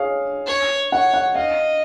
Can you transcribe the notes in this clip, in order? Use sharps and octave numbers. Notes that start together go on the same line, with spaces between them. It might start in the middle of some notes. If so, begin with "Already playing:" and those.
Already playing: G#4 C#5 F5
C#5
C#5 F#5
F#5
D#5 F5